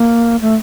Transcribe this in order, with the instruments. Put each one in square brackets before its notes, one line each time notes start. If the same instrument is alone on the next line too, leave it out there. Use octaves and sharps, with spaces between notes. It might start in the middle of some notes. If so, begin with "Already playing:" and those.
Already playing: [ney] A#3
A3